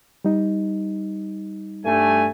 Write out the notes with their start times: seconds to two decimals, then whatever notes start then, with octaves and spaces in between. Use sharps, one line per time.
0.25 G3 D#4
1.85 G2 A3 G#5